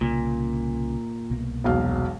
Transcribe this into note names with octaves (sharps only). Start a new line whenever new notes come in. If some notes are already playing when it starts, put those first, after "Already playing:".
C2 A#2 C#3 C#4
C2 B2 A#3
E1 B1 F5